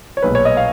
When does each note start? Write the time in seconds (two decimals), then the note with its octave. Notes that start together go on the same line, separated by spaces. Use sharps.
0.17 C#5
0.22 B1 A#2 G#3 B4
0.35 C#5
0.45 D#5
0.57 F5